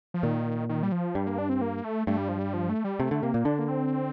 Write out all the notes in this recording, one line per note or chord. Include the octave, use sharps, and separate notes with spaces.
F3
A#2 D#3
D#3
G3
F3
G2 G3
A#3
D4
C4
A#3
A3
G2 A3
G3
F3
G3
F3
A3
G3
C3 A3
D3
C3 A#3
A#2
D3 D4
A#3
C4